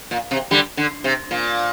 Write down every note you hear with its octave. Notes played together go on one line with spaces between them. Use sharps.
A#2
C3
D3 G3
D3
C3
A#2